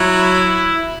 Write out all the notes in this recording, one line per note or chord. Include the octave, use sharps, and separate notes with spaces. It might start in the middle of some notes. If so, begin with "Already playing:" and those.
Already playing: F#3 E4